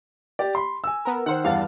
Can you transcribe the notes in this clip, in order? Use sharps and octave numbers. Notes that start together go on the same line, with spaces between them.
G4 D5
B5 C6
G#5 E6
B3 A#4
D#3 C5 F#5
E2 G2 F5 F#5 A6